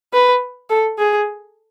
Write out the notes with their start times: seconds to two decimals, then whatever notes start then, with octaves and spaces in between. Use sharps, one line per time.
0.13 B4
0.70 A4
0.98 G#4